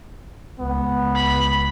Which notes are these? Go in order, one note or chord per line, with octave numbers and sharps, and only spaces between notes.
C#2 B3
B5